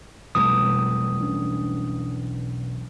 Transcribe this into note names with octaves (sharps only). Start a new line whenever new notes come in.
E1 B1 F2 B2 E3 G3 A3 D#6
B1 C#4 D4